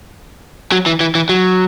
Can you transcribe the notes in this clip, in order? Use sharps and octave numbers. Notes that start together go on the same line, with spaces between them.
F#3
E3
E3
E3
F#3